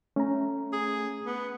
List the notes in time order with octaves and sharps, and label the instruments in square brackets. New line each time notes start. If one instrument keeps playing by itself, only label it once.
[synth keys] A3 [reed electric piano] C#4 A#5
[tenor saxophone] G#4
B3